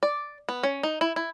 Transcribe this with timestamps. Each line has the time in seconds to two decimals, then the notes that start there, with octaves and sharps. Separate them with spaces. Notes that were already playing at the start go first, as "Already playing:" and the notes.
0.03 D5
0.49 B3
0.63 C#4
0.83 D#4
1.01 E4
1.16 E4